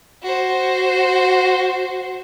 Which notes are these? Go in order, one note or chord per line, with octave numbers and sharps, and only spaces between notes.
F#4 C5